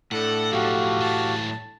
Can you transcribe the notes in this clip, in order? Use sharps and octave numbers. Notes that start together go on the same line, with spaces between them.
A2 D4 A4 F#5
B1 F3 F#4 G4 F5
E3 F#3 A5